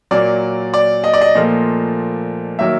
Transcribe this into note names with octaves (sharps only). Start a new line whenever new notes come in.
A#2 F#3 A#3 D5
D5
D#5
D5
D#5
A#2 F3 A3
D#3 F#3 A#3 E5